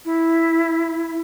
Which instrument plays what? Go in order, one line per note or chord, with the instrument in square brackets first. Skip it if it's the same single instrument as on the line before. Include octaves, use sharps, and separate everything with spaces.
[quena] E4